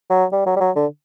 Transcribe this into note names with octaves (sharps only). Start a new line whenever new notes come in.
F#3
G3
F#3
G3
F#3
D3